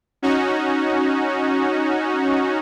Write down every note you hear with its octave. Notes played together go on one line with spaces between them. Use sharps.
C#4 D#4 F#4